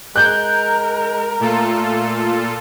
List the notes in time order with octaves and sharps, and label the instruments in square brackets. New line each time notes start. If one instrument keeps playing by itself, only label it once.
[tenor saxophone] G#3 [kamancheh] A#4 [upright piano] F#6 G6
[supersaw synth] A#2 F4 A4 [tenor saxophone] A3